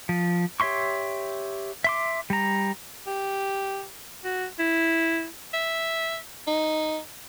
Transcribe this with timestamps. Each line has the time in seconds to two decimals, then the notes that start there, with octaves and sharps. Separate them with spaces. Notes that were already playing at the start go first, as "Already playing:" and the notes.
0.09 F3
0.60 G4 C#5 E5 C6 C#6
1.84 E5 C6 D6
2.30 G3 A#5
3.07 G4
4.24 F#4
4.59 E4
5.54 E5
6.47 D#4